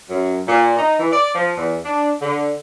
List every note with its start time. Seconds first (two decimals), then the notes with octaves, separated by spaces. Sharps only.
0.09 F#2
0.48 A#2
0.77 D#4
0.99 E3
1.12 D5
1.34 F3
1.58 E2
1.85 D4
2.22 D3